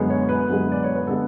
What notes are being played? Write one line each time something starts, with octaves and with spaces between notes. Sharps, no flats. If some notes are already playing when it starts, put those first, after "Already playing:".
Already playing: F#2 D3 G#3 B3
C#5
B4
F#2 D3 G#3 B3
D5
C#5
B4
D3 G#3 B3 A4